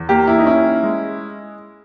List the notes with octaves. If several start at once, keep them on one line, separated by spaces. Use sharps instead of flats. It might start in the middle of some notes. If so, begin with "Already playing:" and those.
Already playing: E2
A#3 G4
E4
D#4
C#4 E4
G#3